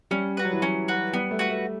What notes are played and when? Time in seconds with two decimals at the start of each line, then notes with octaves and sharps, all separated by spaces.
0.11 G3 C#4
0.37 F#4 B4
0.45 F#3
0.53 E3
0.60 F#3 C#4
0.88 F#4 B4
1.13 G3 B3
1.31 A3
1.39 F#4 B4
1.49 A3